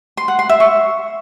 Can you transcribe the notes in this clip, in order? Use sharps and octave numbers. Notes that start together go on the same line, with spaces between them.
C6
F#5
C6
E5
C#6